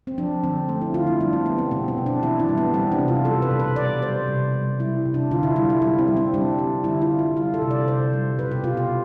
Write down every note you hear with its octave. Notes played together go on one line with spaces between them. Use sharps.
C4
F3 D4
D3 C4
A3 C4
E4
D3 F4
E4
G3 D4
C4
G3 B3
C4
B2 C4
C4
B2
D4
E3 E4
D4
G3
B3
G3 C4
D4
C3
F4
G3 A4
B4
B2
B4
G3 D5
G3 C5
C3
G3
G3 E4
C3
D4
D3 F4
E4
G3 F4
E4
G3 E4
C4
G3
C4
G3 D4
G3
D3 E4
F4
D3
E4
G3 F4
A4
C3
D5
C3 C5
G3
B2 B4
G4
B2 F4
F4